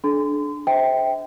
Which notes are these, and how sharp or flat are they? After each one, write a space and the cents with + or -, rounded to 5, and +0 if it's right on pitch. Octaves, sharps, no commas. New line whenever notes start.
D4 +0 A4 -45 C6 -35
C5 +0 E5 -35 G5 +0